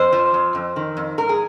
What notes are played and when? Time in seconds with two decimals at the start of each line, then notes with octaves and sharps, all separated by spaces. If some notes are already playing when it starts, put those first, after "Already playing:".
Already playing: F2 C5
0.12 F3
0.34 F2
0.55 F2
0.76 D#3
0.97 F2
1.18 G#2 A#4
1.29 G#4